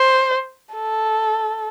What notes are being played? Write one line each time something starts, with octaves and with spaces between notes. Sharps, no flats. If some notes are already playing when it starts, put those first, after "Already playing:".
Already playing: C5
A4